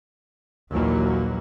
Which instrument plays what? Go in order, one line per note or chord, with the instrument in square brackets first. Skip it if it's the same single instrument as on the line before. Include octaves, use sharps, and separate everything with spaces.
[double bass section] A#1 D#2 E3 F#3 A#3